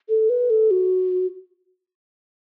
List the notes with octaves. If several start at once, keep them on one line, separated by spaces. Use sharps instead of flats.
A4
B4
A4
F#4